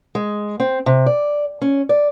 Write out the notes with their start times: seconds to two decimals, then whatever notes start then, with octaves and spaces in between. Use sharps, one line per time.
0.15 G#3
0.60 C4
0.86 C3
1.06 D5
1.62 C#4
1.89 D5